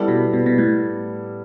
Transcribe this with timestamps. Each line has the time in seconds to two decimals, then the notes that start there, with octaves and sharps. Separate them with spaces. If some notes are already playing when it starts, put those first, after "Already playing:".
Already playing: G3 B3 E4 A4 D5
0.08 B2
0.33 B2
0.46 B2
0.58 A2